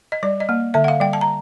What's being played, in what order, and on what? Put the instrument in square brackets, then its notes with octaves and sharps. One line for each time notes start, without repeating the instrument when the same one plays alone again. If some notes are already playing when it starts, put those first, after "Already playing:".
[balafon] D#5
G3 D5
D#5
A#3
D3 E5
F#5
F5
G3 G5
A5
A#5